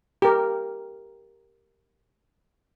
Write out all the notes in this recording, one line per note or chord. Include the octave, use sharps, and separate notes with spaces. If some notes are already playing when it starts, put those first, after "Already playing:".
G4 A#4